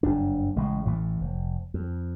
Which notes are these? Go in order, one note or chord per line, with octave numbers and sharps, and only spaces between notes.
F#1 G2 D4
A1 C#3 G#3
A1 A2 E3 A3
F1
F2